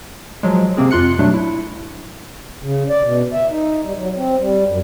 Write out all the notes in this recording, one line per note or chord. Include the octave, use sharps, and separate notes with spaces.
F3 F#3 G#3
C3 A#3 C4 G#4
F2 F4 C6 F#6 C#7
B2 F#3 G3 A3 D4
E4
C#3
D5
B2
E5
D#4
G3
F#3
C4
G3
F#2